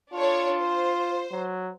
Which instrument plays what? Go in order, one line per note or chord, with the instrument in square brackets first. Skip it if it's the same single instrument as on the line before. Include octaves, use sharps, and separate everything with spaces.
[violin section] D4 A4 C#5 [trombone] F4
[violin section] C5
[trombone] F#3